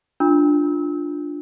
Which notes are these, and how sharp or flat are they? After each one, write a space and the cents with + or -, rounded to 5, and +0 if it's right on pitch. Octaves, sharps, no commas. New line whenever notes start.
D4 +0 F4 +0 E6 -35